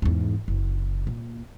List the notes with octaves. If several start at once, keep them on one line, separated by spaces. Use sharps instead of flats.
E2 G#2
F#1
A#2